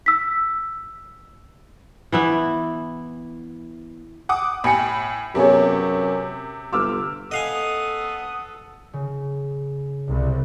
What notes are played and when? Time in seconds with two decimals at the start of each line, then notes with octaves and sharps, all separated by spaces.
0.06 E6 B6
2.12 E3 B3 E4
4.29 F#5 D6 D#6
4.64 A2 G5 G#5 B5 C#7
5.35 F#2 C3 B3 G#4 C#5
6.73 G1 D6 E6 F6
7.31 A4 D#5 F5 F#5 G#5 D#6
8.93 C#3
10.07 C2